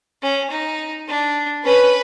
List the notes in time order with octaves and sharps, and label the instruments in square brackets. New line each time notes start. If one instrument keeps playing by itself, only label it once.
[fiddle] C#4
D#4
D4
[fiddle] C#4 [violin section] B4